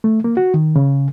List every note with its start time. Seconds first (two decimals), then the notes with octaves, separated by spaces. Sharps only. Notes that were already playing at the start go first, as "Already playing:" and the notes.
0.04 A3
0.24 A#3
0.37 F#4
0.54 D#3
0.76 C#3